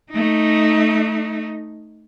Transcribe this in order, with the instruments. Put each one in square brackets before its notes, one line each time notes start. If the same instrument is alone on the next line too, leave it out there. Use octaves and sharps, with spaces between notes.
[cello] A3 D#4